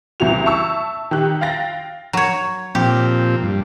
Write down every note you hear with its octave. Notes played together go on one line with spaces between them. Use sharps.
F#1 C2 E3 F#4 F7
E5 A5 C#6 E6
D#3 G4 F#6
F5 G5 A6 A#6
F#3 C#5
A#2 F3 C4 G4
G2